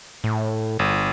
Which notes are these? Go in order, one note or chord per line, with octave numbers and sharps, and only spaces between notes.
A2
G1